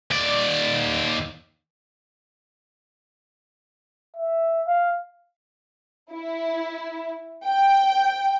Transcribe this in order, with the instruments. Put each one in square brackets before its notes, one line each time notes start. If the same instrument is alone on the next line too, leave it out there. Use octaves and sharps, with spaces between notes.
[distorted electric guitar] D#2 D5
[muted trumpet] E5
F5
[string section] E4
G5